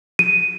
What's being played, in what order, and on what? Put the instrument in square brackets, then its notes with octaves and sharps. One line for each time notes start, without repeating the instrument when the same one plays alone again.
[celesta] D#7